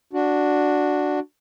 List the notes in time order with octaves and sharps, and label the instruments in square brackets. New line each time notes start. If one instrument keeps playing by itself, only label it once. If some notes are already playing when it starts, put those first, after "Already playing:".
[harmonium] D4 F#4